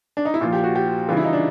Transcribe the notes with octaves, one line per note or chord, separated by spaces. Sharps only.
D4
D#4
E4
A#2 F3 F4
G4
F#4
G4
C#3 E3 G3 F4
E4
D#4
D4